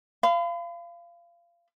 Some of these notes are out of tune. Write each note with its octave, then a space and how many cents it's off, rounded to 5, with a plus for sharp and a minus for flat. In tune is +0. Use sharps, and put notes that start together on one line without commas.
F5 -25 B5 +35